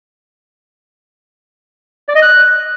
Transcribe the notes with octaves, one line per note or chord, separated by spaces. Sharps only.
D5
D#5
F#6